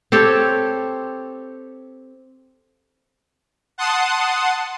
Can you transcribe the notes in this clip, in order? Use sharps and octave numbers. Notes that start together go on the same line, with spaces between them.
C4 G4 A4 C#5
F#5 A5 C6 D#6